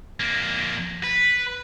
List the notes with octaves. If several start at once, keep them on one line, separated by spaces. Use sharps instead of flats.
F2 A#3
B4